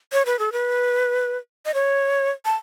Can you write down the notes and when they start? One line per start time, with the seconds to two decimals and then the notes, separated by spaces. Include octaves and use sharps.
0.13 C#5
0.26 B4
0.39 A4
0.52 B4
1.66 D#5
1.74 C#5
2.45 A5